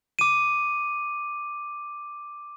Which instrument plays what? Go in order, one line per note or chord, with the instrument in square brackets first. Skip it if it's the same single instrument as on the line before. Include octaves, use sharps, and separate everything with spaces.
[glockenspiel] D6 D#7